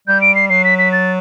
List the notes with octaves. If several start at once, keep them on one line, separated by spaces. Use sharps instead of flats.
G3 G6
D7
C7
F#3 C7
B6
B6
A6